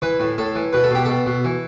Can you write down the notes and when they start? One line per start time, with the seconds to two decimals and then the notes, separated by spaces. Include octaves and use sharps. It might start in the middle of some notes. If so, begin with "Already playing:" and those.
0.02 E3 B4
0.20 A2
0.38 A2 A4
0.55 E3
0.73 B2 B4
0.83 A4
0.91 B2 G4
1.05 B2 A4
1.26 B2
1.44 E3